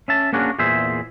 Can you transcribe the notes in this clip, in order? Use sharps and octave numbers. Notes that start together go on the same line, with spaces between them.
C#4 E5 A5
A#3 C#4 D4 F#4 G#4 A#4
E2 A#2 G#4 C5 E5